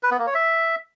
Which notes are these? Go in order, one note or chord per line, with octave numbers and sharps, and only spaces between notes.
B4
B3
A#3
C#5
E5